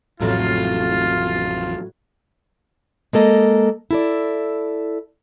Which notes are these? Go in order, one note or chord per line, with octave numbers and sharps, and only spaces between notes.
A1 F2 A2 C3 F#3 A3 F4
G#3 A#3 A4 D#5
E4 A4 D5